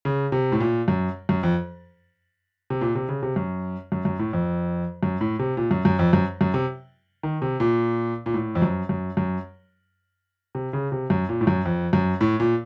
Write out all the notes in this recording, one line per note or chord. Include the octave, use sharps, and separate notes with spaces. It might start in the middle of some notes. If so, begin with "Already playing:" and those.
C#3
C3
A2
A#2
F#2
F#2
F2
C3
A#2
C3
C#3
C3
F#2
F#2
F#2
A2
F2
F#2
A2
C3
A#2
F#2
F#2
F2
F#2
F#2
C3
D#3
C3
A#2
A#2
A2
F2
F#2
F#2
F#2
C3
C#3
C3
F#2
A#2
A2
F#2
F2
F#2
A2
A#2